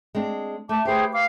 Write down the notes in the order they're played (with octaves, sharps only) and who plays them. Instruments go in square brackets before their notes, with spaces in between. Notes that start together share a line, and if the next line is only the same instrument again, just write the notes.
[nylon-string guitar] G#3 C4 D4
[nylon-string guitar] A3 [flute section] A5 D6
[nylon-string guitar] G4 B4 [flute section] G#4 C5 G5
[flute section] F5 D6